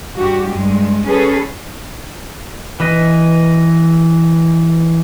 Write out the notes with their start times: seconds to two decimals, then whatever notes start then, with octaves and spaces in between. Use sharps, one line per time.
0.17 G2 F#4 G4
0.50 G2 G#3
1.08 C#4 G#4 A4 B4
2.80 E3 B4 D#5